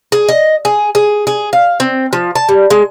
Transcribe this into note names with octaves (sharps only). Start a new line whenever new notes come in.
G#4
D#5
G#4
G#4
G#4
F5
C4
F3
A5
G3
G#3